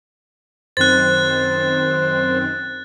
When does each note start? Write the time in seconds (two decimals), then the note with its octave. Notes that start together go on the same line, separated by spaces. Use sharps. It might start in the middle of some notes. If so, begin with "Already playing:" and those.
0.77 F#2 D#3 C4 C5 F#6 A6